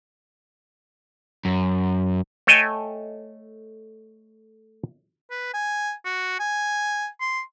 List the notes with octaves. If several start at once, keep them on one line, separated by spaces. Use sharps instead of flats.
F#2
A3 A4 C#5 D#5 G5 G#5
B4
G#5
F#4
G#5
C6